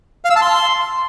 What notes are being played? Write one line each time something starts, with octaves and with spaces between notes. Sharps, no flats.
F5
E6
A5
C6